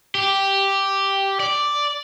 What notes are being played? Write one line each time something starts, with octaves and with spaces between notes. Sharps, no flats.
G4
D5